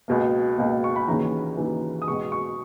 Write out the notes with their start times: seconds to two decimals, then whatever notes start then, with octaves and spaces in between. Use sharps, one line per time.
0.08 C#2 B2 A#3
0.58 C#2 B2 A#3
0.84 C#6
0.96 B5
1.08 D#2 C#3 E3 A#5
1.57 D#2 C#3 E3
2.02 D#6
2.07 C#2 B2 G#3 C#6
2.32 C#6